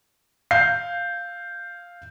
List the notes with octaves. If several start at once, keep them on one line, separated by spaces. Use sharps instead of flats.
F5 G6 C7